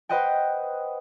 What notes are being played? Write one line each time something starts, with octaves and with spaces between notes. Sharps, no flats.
B4 C5 D#5 F#5 G5